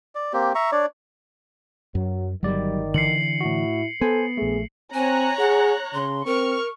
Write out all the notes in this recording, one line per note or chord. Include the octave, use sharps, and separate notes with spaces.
D5
A#3 C4 G4
E5 A#5 C#6
D4 C#5 D5
F#2 F#3
G1 D#3 F#3 G3 D5
D3 E3 C7 C#7 F#7
A2 E4 F#4
B3 A4 C5 G#5
A#1 A3 G#4
C4 C#5 G#5 A#5 F#6
G#4 F#5
C#3 C6
C4 A#4 C#6 F6